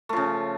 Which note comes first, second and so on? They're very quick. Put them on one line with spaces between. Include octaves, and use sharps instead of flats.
A3 F3 C#3